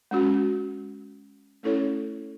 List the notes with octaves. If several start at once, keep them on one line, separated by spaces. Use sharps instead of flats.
G#3 C#4 F#4
A3 C#4 E4 A4 C#5